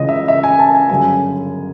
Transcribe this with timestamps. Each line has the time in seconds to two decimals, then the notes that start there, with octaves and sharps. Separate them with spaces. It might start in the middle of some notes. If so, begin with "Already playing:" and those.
Already playing: C#2 C#3 E3 D#5
0.09 E5
0.28 E5
0.43 G#5
0.59 A5
0.75 G#5
0.90 G1 F#2 C#3 G#5